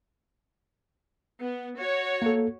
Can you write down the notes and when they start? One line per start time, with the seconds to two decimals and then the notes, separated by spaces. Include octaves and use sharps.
1.40 B3
1.77 F#4 C#5
2.22 A#3 A4